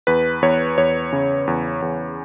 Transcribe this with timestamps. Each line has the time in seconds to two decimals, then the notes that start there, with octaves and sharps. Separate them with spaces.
0.07 E2 B4
0.42 E2 C#5
0.78 E2 C#5
1.13 C#3
1.47 E2
1.82 E2